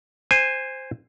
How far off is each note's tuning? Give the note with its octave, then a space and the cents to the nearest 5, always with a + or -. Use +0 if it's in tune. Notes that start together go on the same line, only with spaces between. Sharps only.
C5 +0 G#5 -20